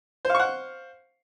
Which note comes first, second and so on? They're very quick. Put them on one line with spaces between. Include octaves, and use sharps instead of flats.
C5 F5 C#6 F#5